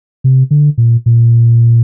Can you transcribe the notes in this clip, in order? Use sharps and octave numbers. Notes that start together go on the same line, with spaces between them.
C3
D3
A#2
A#2